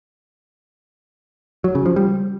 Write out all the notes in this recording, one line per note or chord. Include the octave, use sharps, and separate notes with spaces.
F#3
C#3
F3
G3